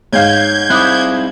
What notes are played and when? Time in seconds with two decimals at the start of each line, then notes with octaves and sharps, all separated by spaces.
0.13 G#2 C#5 F5 G6 G#6
0.70 C4 E4 D6 D#6 F#6